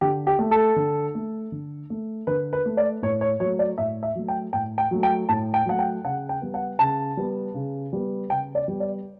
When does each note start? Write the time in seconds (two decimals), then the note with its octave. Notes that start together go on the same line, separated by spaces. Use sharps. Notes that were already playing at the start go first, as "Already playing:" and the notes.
0.01 D3 G4
0.27 G4
0.39 A3
0.51 A4
0.76 D3
1.15 A3
1.52 D3
1.90 A3
2.27 D3 B4
2.53 B4
2.66 A3
2.77 D5
3.02 A2 C#5
3.21 C#5
3.40 F#3 C#5
3.45 A3
3.59 D5
3.78 A2 E5
4.03 E5
4.15 F#3 A3
4.28 G5
4.53 A2 G5
4.78 G5
4.91 F#3 A3
5.03 G5
5.29 A2 A5
5.54 G5
5.66 F#3 A3 F#5
5.79 G5
6.04 C#3 F#5
6.29 G5
6.42 G3 B3
6.54 F#5
6.79 C#3 A5
7.17 G3 B3
7.54 C#3
7.93 G3 B3
8.30 C#3 G5
8.55 D5
8.68 G3 B3
8.80 D5